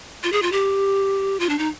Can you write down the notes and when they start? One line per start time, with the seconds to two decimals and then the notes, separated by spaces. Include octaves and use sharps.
0.23 F4
0.32 G#4
0.42 F4
0.52 G4
1.40 F4
1.49 D4
1.59 D#4